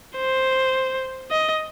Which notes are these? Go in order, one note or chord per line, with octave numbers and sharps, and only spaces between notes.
C5
D#5